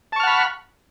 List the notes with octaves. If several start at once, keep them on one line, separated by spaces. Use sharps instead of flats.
F#5 A5 B5 C#6 F6